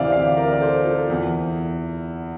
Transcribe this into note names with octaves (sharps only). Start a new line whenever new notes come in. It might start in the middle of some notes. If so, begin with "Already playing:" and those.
Already playing: D2 C3 E3 C5 D5 E5 F5
D5 F5
A#4 D5
D5
A4 C5
F4 A4
E2 E3